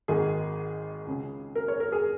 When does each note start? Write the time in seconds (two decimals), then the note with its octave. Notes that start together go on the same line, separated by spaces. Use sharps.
0.08 G#1 G#2 D#3 G#4
1.07 C#2 C#3
1.55 A#4
1.68 C#5
1.80 A#4
1.92 G#4